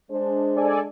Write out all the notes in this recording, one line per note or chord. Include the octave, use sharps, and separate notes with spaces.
G#3 D4 C5
A4 D5 G#5